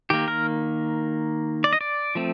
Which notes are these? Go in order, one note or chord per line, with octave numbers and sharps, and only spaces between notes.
D#3 A#3 G4
A#4
D5
D#5
D5
F3 A3 C4